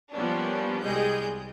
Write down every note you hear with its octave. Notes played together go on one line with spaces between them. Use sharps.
F3 G3 A#3 B3 C#4 D4
C2 G3 G#3 G#4 D#5 G6